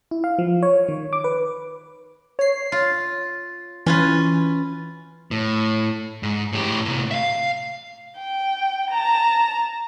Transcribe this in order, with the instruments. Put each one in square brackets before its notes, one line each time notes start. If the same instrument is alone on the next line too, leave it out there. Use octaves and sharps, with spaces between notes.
[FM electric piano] E4
F5
F3
C#5
D#3
D6
B4
[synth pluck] C#5 C7
[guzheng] F4
[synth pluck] E3 [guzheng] C#4 F4 B4
[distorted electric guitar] A2
G#2
A2 G4
A2 C3
E5 F5
[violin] G5
A5 A#5